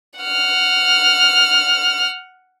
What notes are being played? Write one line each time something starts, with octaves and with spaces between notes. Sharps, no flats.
F#5 F6